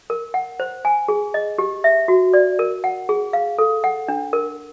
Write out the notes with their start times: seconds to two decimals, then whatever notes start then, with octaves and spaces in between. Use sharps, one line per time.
0.10 A#4
0.34 F#5
0.60 C5
0.85 G#5
1.08 G#4
1.34 D#5
1.58 G4
1.84 E5
2.08 F#4
2.34 D5
2.59 A#4
2.84 F#5
3.09 G#4
3.33 F5
3.59 A4
3.84 F#5
4.08 D4
4.33 A#4